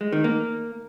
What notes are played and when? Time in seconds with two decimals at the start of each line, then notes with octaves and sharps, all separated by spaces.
0.01 G#3
0.12 D#3
0.24 A#3